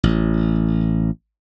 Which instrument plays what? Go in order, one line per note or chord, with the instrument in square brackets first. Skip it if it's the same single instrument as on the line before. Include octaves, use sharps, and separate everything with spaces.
[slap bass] A1